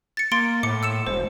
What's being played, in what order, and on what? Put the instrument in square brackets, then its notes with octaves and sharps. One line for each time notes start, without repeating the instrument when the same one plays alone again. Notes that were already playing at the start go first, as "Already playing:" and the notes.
[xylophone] A6 C#7
[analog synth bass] A#3 [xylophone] C6 A6 D7
[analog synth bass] A2 [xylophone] D6 C#7
[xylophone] E6 C#7 E7
[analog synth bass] E1 [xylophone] C5